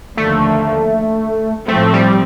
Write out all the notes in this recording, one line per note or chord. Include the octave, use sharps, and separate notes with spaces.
D#2 D3 F3 A3 A#3
A2 F3 A3 C4
G3